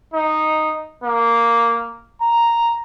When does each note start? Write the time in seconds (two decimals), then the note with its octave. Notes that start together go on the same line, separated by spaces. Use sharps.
0.14 D#4
1.04 A#3
2.22 A#5